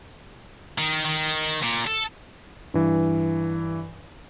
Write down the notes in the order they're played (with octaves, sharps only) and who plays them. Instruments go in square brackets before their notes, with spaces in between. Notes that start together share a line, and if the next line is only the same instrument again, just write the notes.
[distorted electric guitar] D#3
D#3
A#2
A4
[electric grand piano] G2 E3